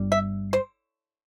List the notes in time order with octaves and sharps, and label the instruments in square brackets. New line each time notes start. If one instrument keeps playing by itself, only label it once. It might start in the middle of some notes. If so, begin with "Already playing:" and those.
Already playing: [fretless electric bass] G1 G2 G3
[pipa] E5
C5